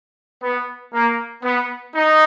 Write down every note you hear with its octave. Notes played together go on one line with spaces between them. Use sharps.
B3
A#3
B3
D#4